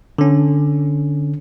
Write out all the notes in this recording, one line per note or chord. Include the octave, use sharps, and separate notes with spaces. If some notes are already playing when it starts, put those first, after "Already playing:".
D3 C#4